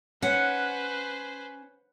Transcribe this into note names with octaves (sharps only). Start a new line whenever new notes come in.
C#4 B4 C5 F#5